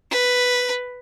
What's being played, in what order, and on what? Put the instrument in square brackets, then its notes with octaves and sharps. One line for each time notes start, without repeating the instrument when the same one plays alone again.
[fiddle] B4